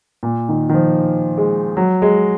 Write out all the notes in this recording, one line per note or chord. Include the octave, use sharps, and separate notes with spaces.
A#2
D#3
D#3
F3
G#3
F#3
G#3